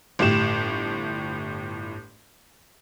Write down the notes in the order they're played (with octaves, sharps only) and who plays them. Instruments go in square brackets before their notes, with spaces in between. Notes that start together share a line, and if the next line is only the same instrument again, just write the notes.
[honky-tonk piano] G1 A2 G4 E7